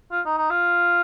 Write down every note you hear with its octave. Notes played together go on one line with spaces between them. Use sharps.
F4
D#4
D#4
F4